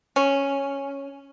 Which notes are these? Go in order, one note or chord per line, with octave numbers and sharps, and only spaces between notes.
C#4